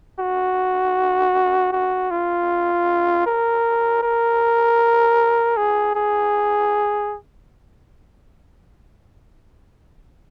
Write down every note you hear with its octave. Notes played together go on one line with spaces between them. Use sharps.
F#4
F#4
F4
A#4
A#4
G#4
G#4